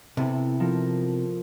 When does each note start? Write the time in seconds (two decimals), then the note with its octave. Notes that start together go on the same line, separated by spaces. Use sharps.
0.17 C3 B3 E4 A4
0.60 F3 A4 A#4